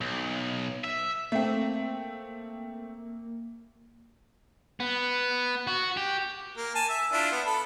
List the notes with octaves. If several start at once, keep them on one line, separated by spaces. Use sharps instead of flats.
B1
E5
A3 A#3 C4
B3
F#4
G4
A#3
G#5 A5
E5
D4 E4 F4
B3
A4 B5